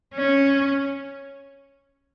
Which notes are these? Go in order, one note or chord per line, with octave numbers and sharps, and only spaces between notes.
C#4